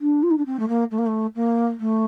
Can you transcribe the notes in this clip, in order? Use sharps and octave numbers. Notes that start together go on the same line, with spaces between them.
D4
F4
D#4
D4
C4
A3
A#3
A3
A#3
A3
A#3
A3